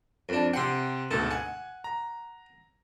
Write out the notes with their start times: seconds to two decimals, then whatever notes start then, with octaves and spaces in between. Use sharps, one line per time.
0.29 F2 D4
0.53 C3 F#5 G5 C6
1.11 D2 G#2 B2 A4
1.31 F#5 G#5
1.84 A#5